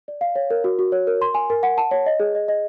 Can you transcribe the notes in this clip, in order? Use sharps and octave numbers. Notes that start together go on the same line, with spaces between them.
D5
F5
C#5
A#4
F#4
F#4
C#5
A#4
C6
G#5
A#4
F#5
A5
C#5
D#5
G#4
D#5
D#5